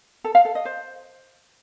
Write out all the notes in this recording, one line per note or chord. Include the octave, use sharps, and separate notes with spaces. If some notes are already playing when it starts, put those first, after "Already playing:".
A4
F5
A4
D#5
C5